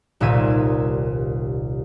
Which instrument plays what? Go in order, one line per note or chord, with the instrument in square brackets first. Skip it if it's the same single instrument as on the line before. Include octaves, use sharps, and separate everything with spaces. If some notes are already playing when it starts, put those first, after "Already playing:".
[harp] D#1 C2 A#2 E5 G#6 D#7